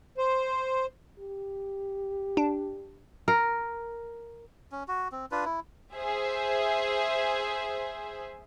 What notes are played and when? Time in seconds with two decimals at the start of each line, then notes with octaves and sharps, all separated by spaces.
0.18 C5
1.19 G4
2.37 D4
3.28 A#4
4.72 C#4
4.88 F#4
5.12 C4
5.32 D4 F4 B4
5.45 E4
5.95 G#4 C5 E5